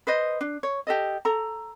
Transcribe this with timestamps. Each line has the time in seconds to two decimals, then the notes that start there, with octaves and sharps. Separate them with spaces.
0.07 B4 C5 D#5
0.41 D4
0.63 C#5
0.87 G4 A4 D#5
1.25 A4 A#5